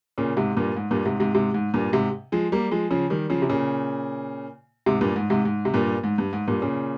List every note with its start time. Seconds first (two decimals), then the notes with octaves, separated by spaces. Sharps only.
0.18 A#2 C#3
0.37 G#2 C3
0.57 G2 A#2
0.76 G#2
0.91 G2 A#2
1.05 G#2 C3
1.20 G#2 C3
1.35 G#2 C3
1.54 G#2
1.74 G2 A#2
1.93 G#2 C3
2.32 F3 G#3
2.52 G3 A#3
2.71 F3 G#3
2.91 C#3 F3
3.10 D#3 G3
3.30 C#3 F3
3.42 C3
3.50 A#2 C#3
4.86 G#2 C3
5.01 G2 A#2
5.16 G#2
5.30 G#2 C3
5.45 G#2
5.65 C3
5.74 G2 A#2
6.04 G#2
6.18 G2
6.33 G#2
6.47 G2 A#2
6.62 A#2 C#3